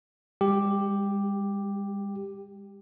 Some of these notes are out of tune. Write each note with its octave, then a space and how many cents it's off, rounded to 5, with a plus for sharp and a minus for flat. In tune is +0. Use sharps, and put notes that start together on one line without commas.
G3 +45 G4 +5